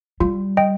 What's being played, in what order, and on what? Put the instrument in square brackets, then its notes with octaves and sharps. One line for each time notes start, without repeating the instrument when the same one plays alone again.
[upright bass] G3 [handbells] F4
[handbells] D#5 G5